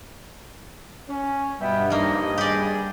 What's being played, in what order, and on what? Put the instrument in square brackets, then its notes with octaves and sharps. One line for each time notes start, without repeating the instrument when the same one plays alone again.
[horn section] C#4
[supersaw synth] G2 [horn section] B2 B3 [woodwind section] G3 E5 G5
[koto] F3 A#3 [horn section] D#4 [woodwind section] D#5
[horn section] D4 G#4 [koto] G4 D5